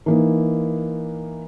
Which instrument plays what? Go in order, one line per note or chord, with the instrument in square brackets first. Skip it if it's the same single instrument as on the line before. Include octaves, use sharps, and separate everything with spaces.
[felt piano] E3 A#3 D#4